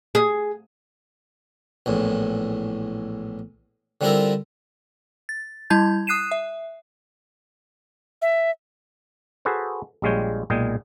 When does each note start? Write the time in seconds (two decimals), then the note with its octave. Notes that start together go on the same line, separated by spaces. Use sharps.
0.15 G#4
1.86 A#1 E2 A2
4.01 D3 G3 C4 E4 F4 A#4
5.29 A6
5.70 G3 E4 A5 G6 G#6
6.07 D#6 F#6 C7 D#7 E7
6.31 E5
8.22 E5
9.45 F#4 G#4 A4 B4 C5
10.02 A#1 G3 G#3 F4 C#5 G5
10.50 B1 A#2 G#3 G#4 G5 G#5